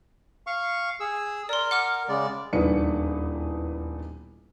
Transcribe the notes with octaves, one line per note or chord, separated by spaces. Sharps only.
F5 C#6
G#4 E6
A#4 D5 C6
F#5 D6 F6
C#3 G#3 D5
D#1 E2 D4 D#4 B4 C#7